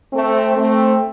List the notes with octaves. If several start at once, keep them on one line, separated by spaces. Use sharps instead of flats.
A3 C4
A3 C4